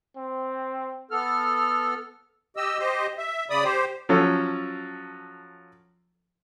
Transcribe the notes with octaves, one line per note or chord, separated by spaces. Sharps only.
C4
B3 A4 F6
G4 D#5 E6
G4 C5 D#5
E5
C#3 D5 B5 D#6
G4 C5
F3 F#3 C#4 A4